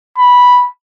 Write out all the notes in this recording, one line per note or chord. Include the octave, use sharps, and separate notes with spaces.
B5